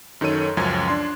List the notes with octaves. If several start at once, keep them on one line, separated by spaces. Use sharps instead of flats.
F#2 D#3 A4 C#5 D#7
C#2 F#2 F3 C#4 G#6
D4 C6